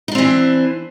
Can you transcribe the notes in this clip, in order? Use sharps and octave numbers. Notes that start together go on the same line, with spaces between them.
E3 C4 D4 D#4